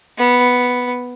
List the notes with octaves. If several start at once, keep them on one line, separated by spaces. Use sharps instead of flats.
B3